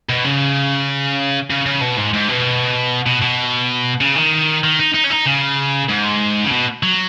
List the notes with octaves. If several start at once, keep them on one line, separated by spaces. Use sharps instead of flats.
B2
C#3
C#3
C#3
B2
G#2
G#2
B2
B2
B2
C#3
D#3
D#3
D#4
D#4
C#4
D#4
C#3
G#2
C#3
B2
F#3